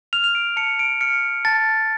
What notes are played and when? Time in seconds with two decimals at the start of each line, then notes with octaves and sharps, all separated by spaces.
0.13 F6 F7
0.24 F7
0.35 D7
0.57 A5 C#7
0.79 D7
1.01 F6 C#7
1.45 A5 A6